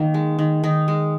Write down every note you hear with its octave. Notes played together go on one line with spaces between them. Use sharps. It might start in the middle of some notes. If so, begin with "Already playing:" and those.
Already playing: D#3 A#3
G#3
D#3
D#3 D#4
G#3